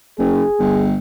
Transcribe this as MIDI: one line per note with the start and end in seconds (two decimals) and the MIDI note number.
0.19 0.44 30
0.19 0.85 68
0.59 0.97 31